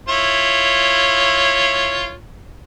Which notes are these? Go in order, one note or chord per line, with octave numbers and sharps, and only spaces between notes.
E4 F4 C#5